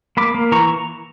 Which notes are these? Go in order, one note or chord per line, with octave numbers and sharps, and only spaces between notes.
A#3 B5 D6
A#3
E3 A#5 C#6